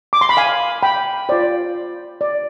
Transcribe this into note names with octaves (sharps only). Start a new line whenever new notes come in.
D6
C6
B5
F5 G#5
G5 B5
F4 C5 D5
D5